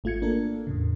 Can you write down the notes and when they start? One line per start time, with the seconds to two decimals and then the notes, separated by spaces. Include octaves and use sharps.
0.04 G#1 A3 F4 G#6 C#7
0.22 A#3 D4 A4 A#4
0.67 E2 A2 C#3